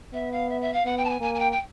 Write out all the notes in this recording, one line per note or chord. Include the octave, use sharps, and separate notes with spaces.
B3 E5
F5
E5
E5
F5
B3 F#5
G5
A5
G#5
A#3 G#5
G#5
G5
G5